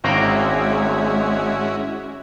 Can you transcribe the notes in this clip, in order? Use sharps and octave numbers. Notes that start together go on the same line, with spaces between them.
G#1 G#3 C#4 E4 F#4 F5 G5 A#5